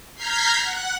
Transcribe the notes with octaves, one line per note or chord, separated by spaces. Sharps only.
A#5 F6 G6 G#6 B6 C7
F#5 F#6